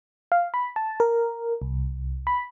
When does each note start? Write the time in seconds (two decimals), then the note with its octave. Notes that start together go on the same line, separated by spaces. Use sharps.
0.32 F5
0.54 B5
0.76 A5
1.00 A#4
1.62 C2
2.27 B5